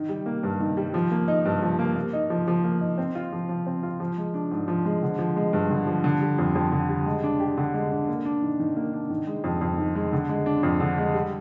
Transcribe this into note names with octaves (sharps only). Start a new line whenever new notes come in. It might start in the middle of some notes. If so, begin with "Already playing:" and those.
Already playing: D#3
G3
A#3
G2
D#3
G3
F3
A#3
D#4
G2
F3
A#3
A#3
D#4
F3
F3
A#3
D#4
C4
F4
F3
F3
C4
F4
F3
G#3
D4
G#2
F3
G#3
D3
F3
G#3
G2
D3
F3
D3
G3
F2
F2
D3
G3
G#3
D4
G4
D3
G#3
D4
A#3
D4
D#3
D#3
A#3
D4
D#3
G#3
F2
F2
D#3
G#3
D3
G#3
D4
F2
D3
G#3
G3